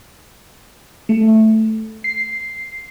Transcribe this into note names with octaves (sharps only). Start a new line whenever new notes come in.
A3
C7